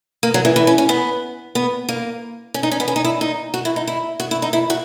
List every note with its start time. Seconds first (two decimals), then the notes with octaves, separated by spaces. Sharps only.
0.23 A#3
0.34 F#3
0.45 E3
0.56 E3
0.67 C#4
0.78 C#4
0.89 B3
1.55 B3
1.89 A#3
2.54 C#4
2.63 D#4
2.71 C#4
2.80 B3
2.88 C#4
2.96 D#4
3.05 E4
3.21 D#4
3.54 F#4
3.65 E4
3.76 D#4
3.87 E4
4.20 F#4
4.31 E4
4.42 D#4
4.53 E4
4.70 F#4